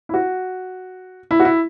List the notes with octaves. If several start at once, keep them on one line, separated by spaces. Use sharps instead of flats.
E4
F#4
E4
F#4
E4